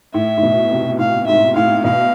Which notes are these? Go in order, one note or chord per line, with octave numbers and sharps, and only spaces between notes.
A2 E5
A2
B2
C3
A2 F5
G#2 E5
A2 F5
B2 F5